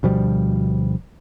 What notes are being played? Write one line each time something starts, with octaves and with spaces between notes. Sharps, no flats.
D2 B2 F3 G3